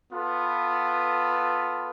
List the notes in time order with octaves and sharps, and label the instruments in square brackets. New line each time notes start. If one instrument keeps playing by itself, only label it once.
[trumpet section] B3 F4 A4 B4